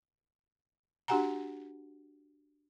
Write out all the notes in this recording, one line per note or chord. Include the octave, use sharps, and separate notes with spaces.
D4 F#4 G4 F#5 G#5 A#5